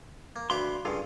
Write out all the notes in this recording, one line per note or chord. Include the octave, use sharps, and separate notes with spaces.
A#3
D2 B4 F5 C6 D6
G2 C#3 F4 A4 F5